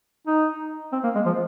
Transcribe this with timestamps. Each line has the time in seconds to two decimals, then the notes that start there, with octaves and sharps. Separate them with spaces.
0.27 D#4
0.92 C4
1.04 A#3
1.15 G#3
1.26 F3